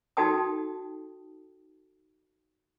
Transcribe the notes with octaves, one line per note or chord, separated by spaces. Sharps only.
D#4 F#4 A4 G5 A5 D#6